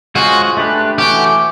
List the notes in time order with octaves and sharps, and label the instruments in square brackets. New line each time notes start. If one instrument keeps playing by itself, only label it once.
[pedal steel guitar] G#3 C#4 F4 G#4 C5 [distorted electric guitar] F#4
[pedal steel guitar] A3 D4 G4 B4
[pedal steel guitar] E3 A3 C#4 F#4 [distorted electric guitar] G4